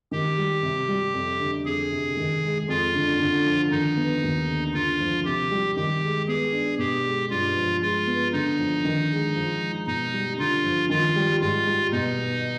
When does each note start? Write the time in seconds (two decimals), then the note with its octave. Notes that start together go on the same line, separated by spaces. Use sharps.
0.11 D#3 G4
0.38 G3
0.62 C3
0.88 G3
1.14 F2
1.40 D3
1.65 F2 G#4
1.91 C3
2.17 D#3
2.42 G#3
2.68 F2 F4
2.95 D3
3.20 D3
3.46 F3
3.71 D#3 D#4
3.97 B3
4.23 D#2
4.47 D3
4.74 D3 F4
5.00 F3
5.25 C3 G4
5.51 G3
5.76 D#3 G4
6.02 G#3
6.28 B3 G#4
6.53 D4
6.78 B2 G4
7.04 G#3
7.30 G2 F4
7.57 F3
7.81 G#3 F4
8.07 B3
8.33 D3 D#4
8.59 F3
8.84 D#3
9.10 G#3
9.36 F3
9.61 G#3
9.87 B2 D#4
10.13 G3
10.38 D3 F4
10.64 F3
10.89 D#3 F4
11.16 G3
11.41 G#2 F4
11.67 G3
11.92 B2 D#4
12.18 B3